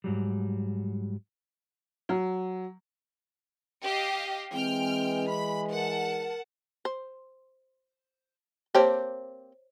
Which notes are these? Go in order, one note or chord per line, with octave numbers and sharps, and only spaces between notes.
G#2 F#3 G3
F#3
G4 D#5 F5
E3 G#3 C4 G5 F6
B5
A#4 F#5 A5
C5
A#3 C4 G4 C5 C#5 A5